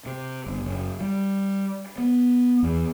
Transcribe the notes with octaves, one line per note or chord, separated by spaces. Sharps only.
C3
G1
F#1
G3
B3
E2